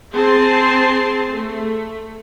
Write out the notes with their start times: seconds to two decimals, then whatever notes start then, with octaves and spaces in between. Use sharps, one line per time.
0.14 C4 G#4 A5 C6
1.33 A3